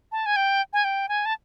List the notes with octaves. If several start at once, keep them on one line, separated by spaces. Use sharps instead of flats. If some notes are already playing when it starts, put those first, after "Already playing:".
A5
G#5
G5
G#5
G5
G#5
A5